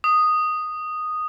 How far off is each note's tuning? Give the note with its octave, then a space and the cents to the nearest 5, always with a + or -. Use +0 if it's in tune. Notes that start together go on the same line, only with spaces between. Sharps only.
D#6 -5